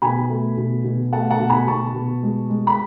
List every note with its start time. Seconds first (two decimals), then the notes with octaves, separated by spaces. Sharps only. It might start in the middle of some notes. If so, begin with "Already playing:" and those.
0.02 B2 G#5 B5
0.30 A3
0.57 B2
0.84 B2
1.13 A3 F#5 A5
1.31 F#5 A5
1.40 B2
1.50 G#5 B5
1.67 B2 A5 C#6
1.95 B2
2.23 G#3
2.50 G#3
2.67 B5